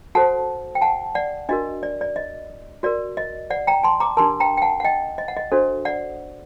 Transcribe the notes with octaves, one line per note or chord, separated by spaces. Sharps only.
F#4 A4 C5 F#5 A5
G5
F#5 A5
D5 F#5
D4 F#4 A#4 D#5
D5
D5
D#5
F#4 A#4 D5
D#5
D5 F#5
G5 A#5
A5 C6
A#5 D6
D4 G4 A#4 A5 C6
G5 A#5
G5
F#5 A5
F#5
D#5 G5
D#5
F#5
D#5
D4 F#4 A4 C5
D5 F#5